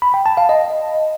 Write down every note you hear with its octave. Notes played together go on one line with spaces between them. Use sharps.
B5
G5
A5
F5
D#5